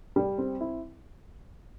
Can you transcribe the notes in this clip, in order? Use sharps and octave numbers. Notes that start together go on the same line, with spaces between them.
G3
C4
E4